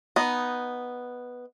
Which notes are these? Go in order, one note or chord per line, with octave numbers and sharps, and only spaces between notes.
B3 D#4